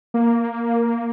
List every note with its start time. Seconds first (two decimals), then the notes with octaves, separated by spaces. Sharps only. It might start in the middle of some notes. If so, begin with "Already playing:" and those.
0.14 A#3